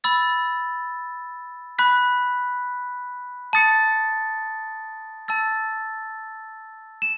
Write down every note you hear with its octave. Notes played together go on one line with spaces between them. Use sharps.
B5 E6 A6
B5 F#6 B6
A5 D#6 A6 C#7
A5 E6 A6
E7